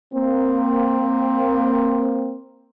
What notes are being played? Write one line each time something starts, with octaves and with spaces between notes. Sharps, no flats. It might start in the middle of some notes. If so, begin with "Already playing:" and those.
A#3 C4